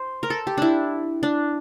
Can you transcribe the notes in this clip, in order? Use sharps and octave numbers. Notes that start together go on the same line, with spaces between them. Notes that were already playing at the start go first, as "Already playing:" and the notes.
Already playing: C5
A#4
A4
G4
D4 E4
D4